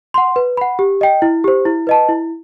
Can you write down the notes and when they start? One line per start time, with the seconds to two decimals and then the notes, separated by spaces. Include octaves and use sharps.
0.14 F#5 C6
0.36 B4
0.57 F#5 B5
0.79 G4
1.01 D#5 G5
1.22 E4
1.44 G4 C5
1.65 E4
1.87 B4 D#5 A5
2.09 E4